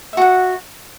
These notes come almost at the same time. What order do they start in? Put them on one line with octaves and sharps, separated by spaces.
E5 F#4 F#5